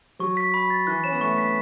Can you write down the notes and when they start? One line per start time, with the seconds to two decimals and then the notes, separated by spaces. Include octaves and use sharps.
0.19 F#3 C#6
0.37 B6
0.54 B5
0.70 A6
0.87 E3 F#6
1.04 C#4 E7
1.12 B3
1.21 A3 C#6
1.38 B6